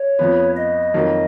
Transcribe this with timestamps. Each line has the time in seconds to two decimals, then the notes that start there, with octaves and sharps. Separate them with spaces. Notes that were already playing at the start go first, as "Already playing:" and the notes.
Already playing: C#5
0.19 F2 F3 B3
0.57 D#5
0.94 F2 D#3 F#3 A#3